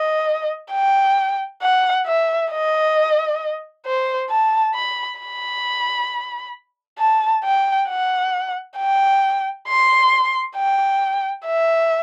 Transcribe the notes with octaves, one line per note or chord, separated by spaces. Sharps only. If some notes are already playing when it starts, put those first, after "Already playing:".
Already playing: D#5
G5
F#5
E5
D#5
C5
A5
B5
B5
A5
G5
F#5
G5
C6
G5
E5